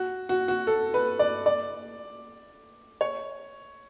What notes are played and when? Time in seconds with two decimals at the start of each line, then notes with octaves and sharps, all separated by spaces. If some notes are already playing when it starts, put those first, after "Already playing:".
Already playing: F#4
0.29 F#4
0.48 F#4
0.67 A4
0.94 B4
1.19 D5
1.46 D5
3.01 C#5